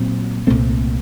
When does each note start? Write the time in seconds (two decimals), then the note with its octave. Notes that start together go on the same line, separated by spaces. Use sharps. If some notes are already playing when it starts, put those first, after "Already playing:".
Already playing: A#2 F#3 C4
0.47 C2 A#2 A3 C4